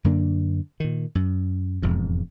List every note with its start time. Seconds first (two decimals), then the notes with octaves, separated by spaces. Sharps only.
0.04 F#2 D3 A#3 D4
0.80 A#2 D#3
1.15 F#2
1.82 E1 F2 G#2